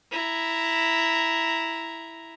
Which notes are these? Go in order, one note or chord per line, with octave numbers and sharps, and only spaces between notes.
E4 A#5